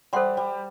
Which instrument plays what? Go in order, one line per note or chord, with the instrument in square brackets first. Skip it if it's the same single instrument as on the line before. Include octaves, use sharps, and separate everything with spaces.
[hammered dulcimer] G3 [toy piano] A4 C5 F#5 C6
[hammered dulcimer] G3